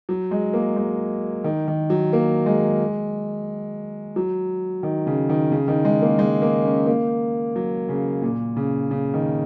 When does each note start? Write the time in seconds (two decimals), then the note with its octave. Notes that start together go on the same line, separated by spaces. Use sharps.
0.09 F#3
0.31 G#3
0.53 A#3
0.76 G#3
1.44 D#3
1.68 D#3
1.90 F#3
2.13 A#3
2.46 G#3
4.16 F#3
4.83 D#3
5.07 C#3
5.29 D#3
5.52 C#3
5.68 D#3
5.85 G#3
6.02 A#3
6.19 G#3
6.42 A#3
6.65 C#4
6.87 A#3
7.56 F#3
7.89 C#3
8.22 A#2
8.56 C#3
8.91 C#3
9.14 D#3